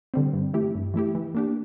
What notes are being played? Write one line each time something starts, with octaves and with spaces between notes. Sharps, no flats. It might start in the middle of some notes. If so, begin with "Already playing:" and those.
D3 G3 C4
G2
E3 A3 E4 G4
G2
E3 A3 E4 G4
E3
A#3 D4 G4